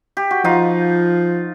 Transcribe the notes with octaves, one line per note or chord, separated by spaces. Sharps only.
G4
F#4
F3 D#4 F4